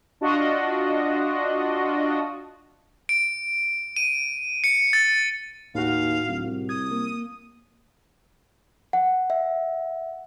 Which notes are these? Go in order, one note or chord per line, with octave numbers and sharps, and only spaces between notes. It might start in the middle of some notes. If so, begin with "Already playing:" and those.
D4 F4 F#4 D#5
D7
D#7
C#7
A6
D#2 A2 F#4 F5
D1
C2
D#6 G#6
A#3
F#5
E5